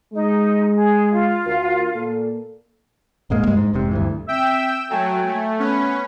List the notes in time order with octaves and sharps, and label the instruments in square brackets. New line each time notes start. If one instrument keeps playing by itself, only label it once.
[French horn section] G#3 [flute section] D#4
[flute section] G#4
F4 F5
[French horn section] D2 F#4 A#4
A#2 A#3 A4
[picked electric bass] D#1 G#2 G#3 A#3
C2 G2 G#3
G#2
F1 G#2 C3
D2 G2 E3
[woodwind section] C4 E5 [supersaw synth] G5 E6
[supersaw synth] F#3 A3 [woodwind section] A4 G5 G#5
[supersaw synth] A3
[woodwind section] B3 B4 [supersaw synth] C#4